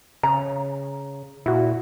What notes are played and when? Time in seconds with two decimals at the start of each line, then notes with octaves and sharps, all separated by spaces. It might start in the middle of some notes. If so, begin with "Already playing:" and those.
0.23 C#3 A#5
1.46 A#2 E4 F#4